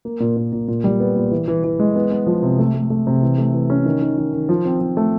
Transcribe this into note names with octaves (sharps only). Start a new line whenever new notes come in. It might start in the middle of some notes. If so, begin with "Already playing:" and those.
A#3
A#2
A#2
A#2
A#2
G3
B3
A#2
E3
E3
E3
G#3
B3
B3
F3
C3
A3
A3
A3
C3
E3
A3
E3
C#4
D#3
D#3
D#3
D#3
F3
C4
F3
A3